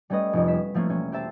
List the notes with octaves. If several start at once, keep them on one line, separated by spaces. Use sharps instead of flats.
G3 A3 C#4 B4 D#5
F1 F2
B6 E7
F3 A3 A#3 C#4
E1 C#4
G4 C5 E5 A5